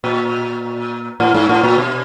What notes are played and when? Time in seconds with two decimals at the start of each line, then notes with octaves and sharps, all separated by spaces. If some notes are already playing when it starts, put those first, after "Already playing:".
0.04 A#2
1.20 A2
1.34 G#2
1.49 A2
1.64 A#2
1.78 B2